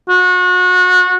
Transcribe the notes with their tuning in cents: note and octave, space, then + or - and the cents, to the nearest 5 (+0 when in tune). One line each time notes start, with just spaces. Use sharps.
F#4 -30